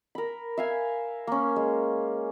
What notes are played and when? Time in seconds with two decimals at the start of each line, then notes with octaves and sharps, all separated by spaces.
0.15 A#4 B5
0.57 E5 F5 G#5
1.27 A#3 C#4
1.56 G#3